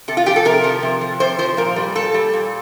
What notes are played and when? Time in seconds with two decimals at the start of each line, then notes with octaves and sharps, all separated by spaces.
0.08 C3 A4
0.17 F4
0.26 F3 G4
0.36 A4
0.45 C3 A#4
0.64 F3
0.83 C3
1.01 F3
1.20 C3 C5
1.38 F3 C5
1.57 A#2 A#4
1.76 G3
1.95 A#2 A4
2.14 G3
2.33 A#2